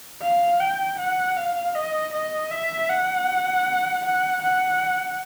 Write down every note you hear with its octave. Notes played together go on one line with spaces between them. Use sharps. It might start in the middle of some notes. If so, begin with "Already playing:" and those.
F5
G5
F#5
F5
D#5
D#5
E5
F#5
F#5
F#5